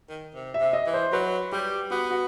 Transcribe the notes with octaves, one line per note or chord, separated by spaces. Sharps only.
D#3
C3
E5
C3
D#5
E3
C5
F#3 B4
G3 G4
B3 F#4
F#4